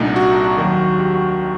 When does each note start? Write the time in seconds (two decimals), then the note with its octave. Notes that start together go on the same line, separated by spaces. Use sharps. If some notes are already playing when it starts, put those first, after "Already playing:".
Already playing: C2 A#2 A3 D4 D#4
0.16 F#4
0.58 D#2 D#3 F#3
0.99 G4